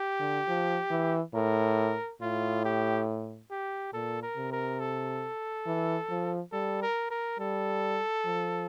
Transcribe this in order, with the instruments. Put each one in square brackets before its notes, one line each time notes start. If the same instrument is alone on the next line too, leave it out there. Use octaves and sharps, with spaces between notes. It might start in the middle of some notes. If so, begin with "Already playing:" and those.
Already playing: [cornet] G4
[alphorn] D3
F3
E3
[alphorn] A2 [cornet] A#4
[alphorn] A2 [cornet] F4
[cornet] G4
G4
[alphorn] A#2 [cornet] A4
[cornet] A#4
[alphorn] C3
[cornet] A#4
A4
[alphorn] E3
F3
[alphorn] G3 [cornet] A4
[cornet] A#4
A#4
[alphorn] G3 [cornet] A4
[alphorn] F3